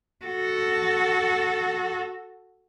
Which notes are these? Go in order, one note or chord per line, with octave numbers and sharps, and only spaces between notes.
F#4 A4